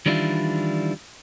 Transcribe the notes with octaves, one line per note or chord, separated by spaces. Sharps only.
D#3 E3 G3 D4 E4 F4